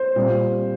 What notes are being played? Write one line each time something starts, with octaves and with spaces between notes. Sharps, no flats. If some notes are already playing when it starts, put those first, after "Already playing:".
Already playing: C5
A#2 G3 C4 F4